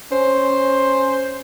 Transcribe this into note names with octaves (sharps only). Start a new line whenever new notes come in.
C#4 C5